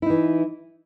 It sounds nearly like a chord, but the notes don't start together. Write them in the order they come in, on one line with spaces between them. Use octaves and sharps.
E4 D#4 E3